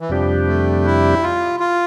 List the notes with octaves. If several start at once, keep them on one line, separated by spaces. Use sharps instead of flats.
E3
F2 C3 F3 G3 D4 G4
A3
E4
F4
F4